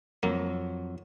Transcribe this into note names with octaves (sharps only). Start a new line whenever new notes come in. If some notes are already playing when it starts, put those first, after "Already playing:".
F2 F#3 A#3